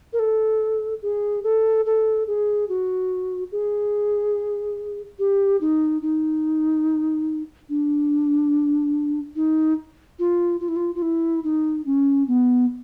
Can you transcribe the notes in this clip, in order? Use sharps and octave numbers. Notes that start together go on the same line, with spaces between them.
A#4
A4
G#4
A4
A4
G#4
F#4
G#4
G4
D#4
D#4
D4
D#4
F4
F4
E4
F4
F4
E4
D#4
C#4
B3